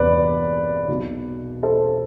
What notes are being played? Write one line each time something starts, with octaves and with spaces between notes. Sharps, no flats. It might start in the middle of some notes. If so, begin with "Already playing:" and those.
Already playing: E1 E2 C3 E3 B4 D5
B1 B2
A4 C5